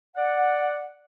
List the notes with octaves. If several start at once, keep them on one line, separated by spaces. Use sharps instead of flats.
D5 F#5